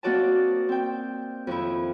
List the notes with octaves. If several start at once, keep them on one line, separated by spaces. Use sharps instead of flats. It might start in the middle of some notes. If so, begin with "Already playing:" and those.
A#3 C4 F#4 D5 D#5 A5
C4 G5
F2 D#3 E4